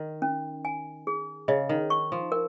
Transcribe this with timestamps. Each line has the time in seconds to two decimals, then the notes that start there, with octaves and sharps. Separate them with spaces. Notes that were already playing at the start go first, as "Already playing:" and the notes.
Already playing: D#3
0.22 C#4
0.65 G#5
1.07 G#4
1.48 C#3 D#5
1.69 D#3
1.90 C#6
2.12 F3
2.32 A#4